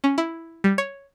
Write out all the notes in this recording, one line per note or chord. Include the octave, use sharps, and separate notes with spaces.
C#4
E4
G3
C#5